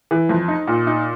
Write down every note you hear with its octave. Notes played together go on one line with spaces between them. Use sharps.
E3
F2
D#4
A#2
D#4